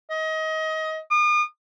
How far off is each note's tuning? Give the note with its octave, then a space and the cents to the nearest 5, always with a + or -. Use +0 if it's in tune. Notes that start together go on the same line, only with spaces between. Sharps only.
D#5 +25
D#6 -40